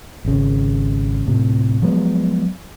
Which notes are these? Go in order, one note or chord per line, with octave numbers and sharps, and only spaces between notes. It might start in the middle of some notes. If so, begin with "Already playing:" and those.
G#1 C#3
D1 A2 C3
F3 F#3 G#3 B3